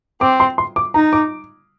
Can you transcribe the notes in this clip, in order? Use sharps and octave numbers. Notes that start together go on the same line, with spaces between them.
C4 D6
C6
C6
D6
D#4 A#5
D6